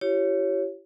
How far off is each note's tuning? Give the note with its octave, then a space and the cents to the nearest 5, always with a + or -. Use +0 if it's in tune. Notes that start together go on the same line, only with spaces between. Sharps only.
E4 +40 G4 -25 C#5 +0